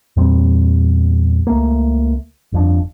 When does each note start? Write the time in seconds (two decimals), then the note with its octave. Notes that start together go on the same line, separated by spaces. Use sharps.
0.17 E2 A#2 G3 C4
1.47 C#2 A3 A#3
2.52 G1 F2 D4